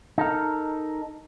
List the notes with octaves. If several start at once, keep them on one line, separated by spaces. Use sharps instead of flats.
D#4 A4 A#4